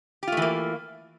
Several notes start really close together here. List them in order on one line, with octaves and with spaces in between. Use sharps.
G4 F4 A3 E3 A#3